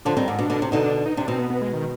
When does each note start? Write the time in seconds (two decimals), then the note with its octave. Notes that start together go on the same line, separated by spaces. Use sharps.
0.05 D3 F3 D4
0.17 D#3 G3 C4
0.28 G#2 D4
0.39 B2 D4
0.50 B2 D3
0.62 C3
0.72 B2 D3 D#4
0.84 D4
1.06 D#4
1.17 C3 D4
1.28 B2 C4
1.39 B3
1.50 B3
1.62 G#3
1.73 D#3